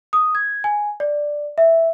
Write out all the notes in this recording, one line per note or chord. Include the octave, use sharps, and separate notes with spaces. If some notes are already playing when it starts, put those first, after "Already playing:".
D#6
G#6
G#5
D5
E5